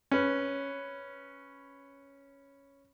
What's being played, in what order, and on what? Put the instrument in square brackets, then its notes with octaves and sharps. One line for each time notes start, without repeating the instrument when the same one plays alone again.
[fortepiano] C#4 B4